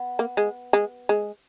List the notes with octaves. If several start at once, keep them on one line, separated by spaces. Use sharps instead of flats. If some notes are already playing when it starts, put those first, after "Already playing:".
Already playing: B3
A#3
G#3
G#3
G#3